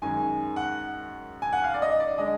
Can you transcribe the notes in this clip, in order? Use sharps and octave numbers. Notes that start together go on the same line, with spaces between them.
F#2 D#3 G#3 G#5
F#5
G#5
F#5
F5
D5
D#5
D5
D3 G#3 D#5